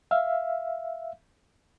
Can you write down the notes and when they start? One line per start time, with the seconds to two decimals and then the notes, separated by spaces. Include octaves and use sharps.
0.11 E5 F5